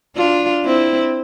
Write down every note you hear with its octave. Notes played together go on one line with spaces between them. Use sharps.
D4 F4
C4 E4